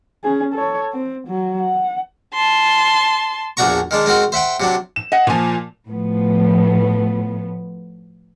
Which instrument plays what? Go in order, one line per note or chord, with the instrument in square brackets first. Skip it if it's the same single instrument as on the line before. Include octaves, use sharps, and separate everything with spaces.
[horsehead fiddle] C#4 G#4
A4 C#5
C4
F#3
F#5
[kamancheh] A5 C6
[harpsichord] A#1 E2 D4 F#4 A#5 C#6
D#3 G#3 D4
G#3 C4 F#4 A#4
C5 E5 F#5 G5
C3 F#3 D4
[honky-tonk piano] E7
[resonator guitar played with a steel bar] D#5 F#5
[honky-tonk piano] A#2 F3 [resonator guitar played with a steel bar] F4 G#5
[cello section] A2 F3 B3